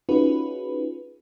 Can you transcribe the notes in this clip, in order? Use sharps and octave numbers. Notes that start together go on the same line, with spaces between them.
C#4 D#4 F4 F#4 G#4 B4